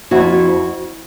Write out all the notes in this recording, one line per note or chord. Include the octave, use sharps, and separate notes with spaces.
F2 E4 F#4